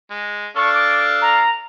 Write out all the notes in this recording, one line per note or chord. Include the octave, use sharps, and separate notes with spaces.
G#3
D4 A4 F5 C#6
D6
A#5